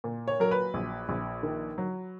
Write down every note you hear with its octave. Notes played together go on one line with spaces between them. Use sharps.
A#2
C#5
F#3 A#4
B4
A#1
A#1
D#3
F#3